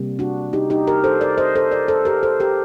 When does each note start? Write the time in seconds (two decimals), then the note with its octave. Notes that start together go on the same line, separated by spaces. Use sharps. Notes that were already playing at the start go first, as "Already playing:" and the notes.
Already playing: C3 G3 A#3
0.19 D4 F#4
0.53 D#4 G4
0.70 D#4 G4
0.87 G4 A#4
1.04 A4 C5
1.21 A#4 D5
1.38 C5 D#5
1.55 A4 C5
1.71 A#4 D5
1.88 A4 C5
2.05 G4 A#4
2.23 A4 C5
2.40 G4 A#4